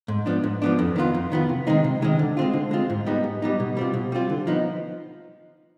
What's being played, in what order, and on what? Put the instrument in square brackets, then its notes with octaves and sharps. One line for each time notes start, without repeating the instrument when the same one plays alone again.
[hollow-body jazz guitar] G#2
F3 B3 D4
G#2
F3 B3 D4
F2
D#3 B3 F4
F2
D#3 B3 F4
C3
D#3 G#3 C4 D#4
C3
D#3 G#3 C4 D#4
D3
G#3 C4 F4
D3
G#3 C4 F4
G#2
G3 B3 D#4
G#2
G3 B3 D#4
B2
G3 C4 F4
B2
G3 C4 F4
D3
F3 B3 D#4